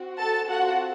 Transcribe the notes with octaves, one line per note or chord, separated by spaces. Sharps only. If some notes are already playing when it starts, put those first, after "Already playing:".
Already playing: C4 F#4
A4 A5
C4 F4 F#4 A4 F#5